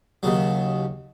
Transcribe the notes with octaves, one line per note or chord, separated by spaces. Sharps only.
D#2 C#3 F#3